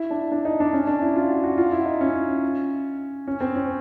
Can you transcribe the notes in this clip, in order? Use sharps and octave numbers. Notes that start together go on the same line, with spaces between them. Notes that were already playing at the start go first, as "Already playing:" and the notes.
Already playing: E4
D4
D4
D#4
D4
C#4
D4
E4
F4
F#4
F#4
F4
E4
D#4
C#4
C#4
C4
C#4